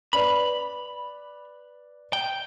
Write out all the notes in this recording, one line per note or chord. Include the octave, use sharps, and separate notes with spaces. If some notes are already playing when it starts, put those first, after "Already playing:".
B4 D5 B5 F7
G5